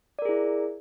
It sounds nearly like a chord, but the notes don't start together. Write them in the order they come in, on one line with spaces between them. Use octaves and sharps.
D5 A#4 G#4 E4